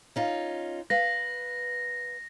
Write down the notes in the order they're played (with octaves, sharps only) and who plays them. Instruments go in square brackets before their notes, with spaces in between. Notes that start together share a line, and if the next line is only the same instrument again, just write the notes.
[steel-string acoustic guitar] C#4 D#4 F4
[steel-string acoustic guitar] B4 F5 [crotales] A#6